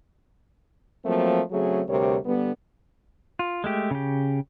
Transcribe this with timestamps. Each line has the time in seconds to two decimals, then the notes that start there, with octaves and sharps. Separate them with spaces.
1.05 F3 F#3 A3 A#3 C4
1.51 C#3 F#3 A3 C4 G#4
1.89 D2 C3 G3 A#4 C#5
2.25 D3 G3 B3
3.39 F4
3.64 G#3 A3 G4
3.91 C#3 G4